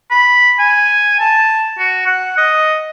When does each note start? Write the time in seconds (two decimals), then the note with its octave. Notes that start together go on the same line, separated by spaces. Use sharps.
0.11 B5
0.59 G#5
1.20 A5
1.79 F#4
2.06 F#5
2.38 D#5